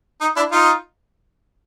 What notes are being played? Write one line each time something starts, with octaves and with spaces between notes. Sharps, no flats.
D#4
D4 E4
D#4 F4